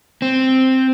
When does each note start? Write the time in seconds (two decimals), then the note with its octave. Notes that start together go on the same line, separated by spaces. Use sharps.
0.22 C4